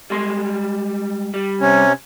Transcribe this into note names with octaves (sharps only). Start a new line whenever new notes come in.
G3 G#3 C6
G3
C3 C#4